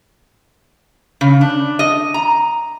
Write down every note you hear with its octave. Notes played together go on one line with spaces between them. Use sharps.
C#3
D4
D#5
A#5